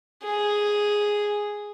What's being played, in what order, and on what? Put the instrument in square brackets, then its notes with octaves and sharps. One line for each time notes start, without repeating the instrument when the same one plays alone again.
[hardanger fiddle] G#4